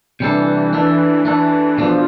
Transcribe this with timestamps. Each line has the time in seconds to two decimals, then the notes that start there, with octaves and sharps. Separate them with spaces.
0.20 C3 E3 G3 D4 A4
0.73 E3 A3 D4 A4
1.25 E3 A3 D4 A4
1.77 B2 F3 A3 D4